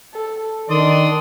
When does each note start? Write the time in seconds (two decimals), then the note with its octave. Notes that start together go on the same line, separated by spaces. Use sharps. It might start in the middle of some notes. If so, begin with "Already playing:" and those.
0.14 A4
0.70 D#3 D4 D5 C6 D#6